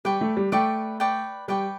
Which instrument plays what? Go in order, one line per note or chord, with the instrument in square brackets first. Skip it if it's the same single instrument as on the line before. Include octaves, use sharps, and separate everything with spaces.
[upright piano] G3 [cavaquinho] B4 D5 G5 C#6
[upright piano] A3
G3
[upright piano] A3 [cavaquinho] B4 D5 G5 C#6
[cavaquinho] B4 D5 G5 C#6
[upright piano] G3 [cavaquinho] B4 D5 G5 C#6